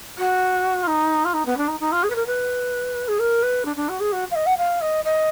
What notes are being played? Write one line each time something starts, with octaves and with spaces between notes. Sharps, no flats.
F#4
F4
D#4
F4
D#4
B3
D4
D#4
D#4
F4
G#4
B4
A#4
B4
G#4
A#4
B4
D4
D4
F#4
G#4
F#4
F5
D#5
F#5
F5
D#5
D#5